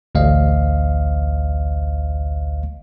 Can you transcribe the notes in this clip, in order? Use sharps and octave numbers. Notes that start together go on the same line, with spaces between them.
A1 D2 C5 D#5 F5